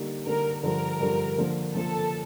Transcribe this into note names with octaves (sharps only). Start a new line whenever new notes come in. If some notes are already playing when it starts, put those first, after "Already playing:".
Already playing: D3 G3 A#3 D#4
D3 G3 A#3 D#4 A#4
G2 D3 F3 A#4
G2 D3 F3
D3 F3 A#3
D3 F3 A#3 A4